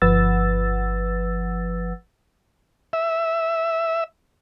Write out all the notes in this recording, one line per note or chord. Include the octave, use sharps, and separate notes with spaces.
G1 F3 B4 F#5 E6 A6
E5